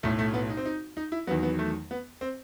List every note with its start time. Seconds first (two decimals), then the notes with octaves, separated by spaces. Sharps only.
0.03 B1 A2 F#3 A3
0.19 A3
0.34 B3
0.50 D#4
0.57 C4
0.65 D#4
0.97 D#4
1.12 E4
1.27 F#3 B3
1.30 E2 D#3
1.43 B3
1.59 A3
1.91 B3
2.21 C4